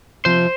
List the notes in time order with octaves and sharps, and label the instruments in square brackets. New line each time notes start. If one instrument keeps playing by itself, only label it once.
[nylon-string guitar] C3 F3 C4 [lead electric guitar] C5